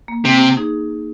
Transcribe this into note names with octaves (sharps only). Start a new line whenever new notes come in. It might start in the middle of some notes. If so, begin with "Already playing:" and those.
A#3
C3
D#4 G#4